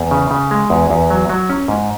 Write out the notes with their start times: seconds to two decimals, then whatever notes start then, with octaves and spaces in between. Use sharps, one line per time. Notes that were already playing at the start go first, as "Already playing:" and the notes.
Already playing: E2
0.11 C#3
0.31 C#3
0.51 G#3
0.70 E2
0.90 E2
1.10 F#3
1.30 F#3
1.50 C#4
1.68 G#2